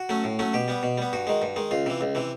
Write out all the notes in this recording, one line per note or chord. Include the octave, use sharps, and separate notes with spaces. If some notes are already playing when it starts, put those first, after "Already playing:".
Already playing: F#4
F#3 A3 C#4
A2
F#3 A3 C#4
B2 G4
G3 B3
B2
G3 B3
G2 F#4
D#3 G#3
G2
D#3 G#3
C#2 F4
C3 E3
C#2
C3 E3